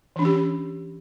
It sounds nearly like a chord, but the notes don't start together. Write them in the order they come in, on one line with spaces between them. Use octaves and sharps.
E3 D4 C#4 G4